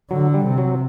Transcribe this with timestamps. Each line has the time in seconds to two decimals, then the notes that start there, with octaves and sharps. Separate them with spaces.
0.11 D3 F#3
0.34 G3
0.46 C3
0.58 F#3